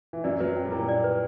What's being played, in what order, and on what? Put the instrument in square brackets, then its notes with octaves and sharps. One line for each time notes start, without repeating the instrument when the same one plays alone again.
[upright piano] E3
[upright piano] F#2 F#3 [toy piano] D5
[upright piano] F#2 F#3 [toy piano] B4
[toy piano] G5
[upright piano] G3
[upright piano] A#2 A#3 [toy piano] E4
[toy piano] D5
B4